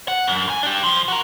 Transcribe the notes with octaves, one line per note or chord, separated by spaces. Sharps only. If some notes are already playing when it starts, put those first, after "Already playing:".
F#5
F#2
E2 G#5
D4 G4
B1 F3
F#4 A#4